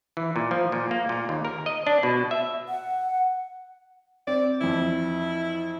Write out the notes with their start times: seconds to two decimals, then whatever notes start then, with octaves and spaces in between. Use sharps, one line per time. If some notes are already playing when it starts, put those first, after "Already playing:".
0.17 E3
0.36 A#2
0.51 F3
0.72 A#2
0.91 A#3
1.09 A#2
1.29 D#2
1.45 A#4
1.66 D#5
1.87 D4
2.03 B2
2.31 E5
2.69 F#5
4.27 C4 D5
4.61 F2 E3 E4